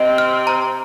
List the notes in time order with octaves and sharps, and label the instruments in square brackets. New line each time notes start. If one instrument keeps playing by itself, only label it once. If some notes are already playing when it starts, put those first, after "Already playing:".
Already playing: [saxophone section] C3 C4 [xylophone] D#5
[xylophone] F6
A#5